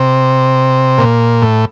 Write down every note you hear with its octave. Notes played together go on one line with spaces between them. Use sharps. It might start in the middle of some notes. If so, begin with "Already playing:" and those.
Already playing: C3
A#2
A2